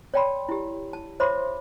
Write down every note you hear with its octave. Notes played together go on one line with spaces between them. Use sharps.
C#5 D5 G5 A5 B5 C6
E4 G4
A5
C5 C#5 E5 B5 C6 D6